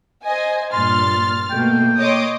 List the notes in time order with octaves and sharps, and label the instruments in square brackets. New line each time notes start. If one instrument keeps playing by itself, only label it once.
[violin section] C5 D#5 G#5
[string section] G2 A#2 [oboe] C6 [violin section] F6 A6
[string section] B2 A3 A#3 [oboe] G5
[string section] A#3 C#5 D#5 [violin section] C6 D6 D#6